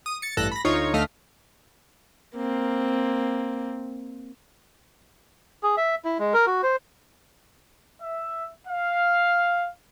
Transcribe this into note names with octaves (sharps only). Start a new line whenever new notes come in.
D#6
A6 C#7
A1 G2 A4 F#6 A#6
B5 A#6
D2 D#4 F4 C#5 C#6
D2 A3 D#5 F5 F6 B6
A#3 C4
G#4
E5
E4
G#3
A#4
F#4
C5
E5
F5